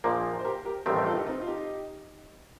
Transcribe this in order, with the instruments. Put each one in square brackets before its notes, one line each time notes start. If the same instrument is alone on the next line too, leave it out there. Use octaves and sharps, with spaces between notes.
[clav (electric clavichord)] A#1 A#2 F3 A#3 [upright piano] A#4 D5
[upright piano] C5
G4 A#4
G4 A#4
[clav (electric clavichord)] A1 G2 D#3 A3 C4 [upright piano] G4 A#4
[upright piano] G4 A#4
F4 A4
D#4 G4
C4 D#4
F4
D#4 G4